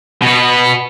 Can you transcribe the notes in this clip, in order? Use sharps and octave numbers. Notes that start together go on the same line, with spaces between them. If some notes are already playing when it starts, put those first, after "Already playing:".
B2 B3